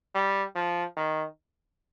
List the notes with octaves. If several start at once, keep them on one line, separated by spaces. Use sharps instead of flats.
G3
F3
D#3